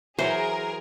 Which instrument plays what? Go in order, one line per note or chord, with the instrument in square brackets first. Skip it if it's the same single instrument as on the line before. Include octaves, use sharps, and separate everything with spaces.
[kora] E3 F#3 [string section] G#4 A#4 [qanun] C5